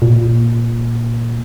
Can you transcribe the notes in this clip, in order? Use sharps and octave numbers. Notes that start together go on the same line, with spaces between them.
A#2